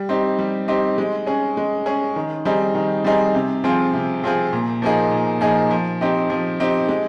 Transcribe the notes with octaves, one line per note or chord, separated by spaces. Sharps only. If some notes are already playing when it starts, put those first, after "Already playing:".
Already playing: G3
C4 D#4 G4
G3
C4 D#4 G4
G#3
C#4 G#4
G#3
C#4 G#4
D#3
G3 C4 D#4 G#4
D#3
G3 C4 D#4 G#4
C3
F3 C4 F4 G#4
C3
F3 C4 F4 G#4
A#2
F3 A#3 D#4 G#4
A#2
F3 A#3 D#4 G#4
F3
C4 D#4 G4
F3
C4 D#4 G4
G#3